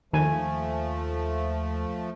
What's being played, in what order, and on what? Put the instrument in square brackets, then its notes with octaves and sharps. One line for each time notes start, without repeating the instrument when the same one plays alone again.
[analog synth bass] D#2 [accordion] F3 A3 [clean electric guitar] G#5